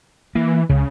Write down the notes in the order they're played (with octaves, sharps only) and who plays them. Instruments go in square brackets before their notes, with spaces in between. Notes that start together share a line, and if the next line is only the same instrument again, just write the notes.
[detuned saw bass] E3 [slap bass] A#3
[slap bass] C#2 [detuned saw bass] C#3